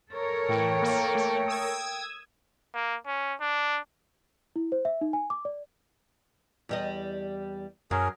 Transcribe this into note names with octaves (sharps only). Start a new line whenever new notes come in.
A4 A#4 C#5
A2 E3 G5
A#3
A3
D#6 E6 G#6
A#3
C#4
D4
E4
C5
E5
D#4
G#5
D6
D5
E2 G3 D#5
F#2 F#3 C#4 G#4 A#4